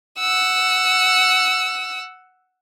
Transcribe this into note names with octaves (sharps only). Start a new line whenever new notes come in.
F#5 E6